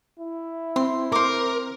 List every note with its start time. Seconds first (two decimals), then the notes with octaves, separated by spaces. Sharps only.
0.20 E4
0.76 C4 C6
1.12 A#4 C5 D6